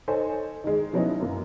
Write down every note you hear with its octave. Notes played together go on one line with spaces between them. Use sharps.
D#4 A4 C5 C#5 D#5 G#5
D#3 G#3
F3 F#3 B3 C#4 D#4 E4
F#2 A#3